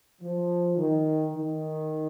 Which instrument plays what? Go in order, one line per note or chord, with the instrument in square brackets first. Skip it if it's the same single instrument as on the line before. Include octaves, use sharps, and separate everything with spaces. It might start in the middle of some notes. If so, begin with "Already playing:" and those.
[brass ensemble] F3
D#3
D#3